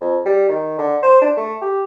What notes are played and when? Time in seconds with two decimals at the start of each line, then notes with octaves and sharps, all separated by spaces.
0.01 F2
0.26 G3
0.49 D#3
0.78 D3
1.03 C5
1.21 D4
1.37 A3
1.62 G4